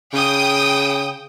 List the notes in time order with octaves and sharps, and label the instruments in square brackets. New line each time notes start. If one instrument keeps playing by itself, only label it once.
[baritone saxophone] C#3 [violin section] G5 D#6